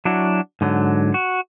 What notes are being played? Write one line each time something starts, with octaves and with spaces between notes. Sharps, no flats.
F#3 D4 E4 F#4
G#2 D3 F#3
F#4